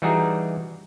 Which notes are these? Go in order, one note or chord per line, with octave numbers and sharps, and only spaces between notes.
E3 G3 D#4 F#4 G#4 A#5